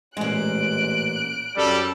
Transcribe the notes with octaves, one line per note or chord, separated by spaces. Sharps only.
A1 A#2 G#3 F#6 D7
F#2 G3 A4